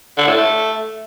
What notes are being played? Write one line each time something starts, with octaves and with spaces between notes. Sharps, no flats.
D3
A2
A3